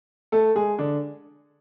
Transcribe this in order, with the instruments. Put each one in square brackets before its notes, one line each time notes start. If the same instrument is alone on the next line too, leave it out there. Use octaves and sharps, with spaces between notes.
[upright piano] A3 A4
G#3 G#4
D3 D4